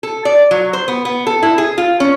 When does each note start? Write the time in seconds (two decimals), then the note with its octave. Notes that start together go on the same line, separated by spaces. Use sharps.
0.03 A4
0.25 D5
0.51 F#3
0.73 C5
0.88 B3
1.05 B3
1.27 A4
1.43 E4
1.58 G#4
1.78 F4
2.00 C#4